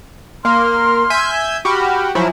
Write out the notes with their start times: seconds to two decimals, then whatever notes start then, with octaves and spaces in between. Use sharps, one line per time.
0.45 A#3 C6 F6
1.10 E5 G#5 G6
1.65 F#4 G4 B5 F6
2.15 F3 F#3 E4 G#5